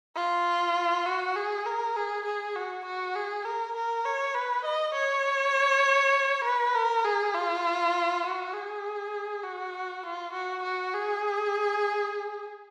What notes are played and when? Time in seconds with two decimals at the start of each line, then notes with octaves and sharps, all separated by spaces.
0.16 F4
1.06 F#4
1.36 G#4
1.66 A#4
1.96 G#4
2.26 G#4
2.56 F#4
2.86 F#4
3.16 G#4
3.45 A#4
3.76 A#4
4.05 C#5
4.35 B4
4.65 D#5
4.95 C#5
6.44 B4
6.75 A#4
7.05 G#4
7.34 F4
8.24 F#4
8.54 G#4
9.43 F#4
10.03 F4
10.33 F#4
10.63 F#4
10.93 G#4